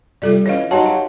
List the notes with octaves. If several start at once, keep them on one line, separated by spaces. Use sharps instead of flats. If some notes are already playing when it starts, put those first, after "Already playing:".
C3 G3 F4 A4 D5
E3 C#4 C#5 D#5 F5
F#3 D#4 F#4 G4 C5 D#5 A5
G4 F5 C6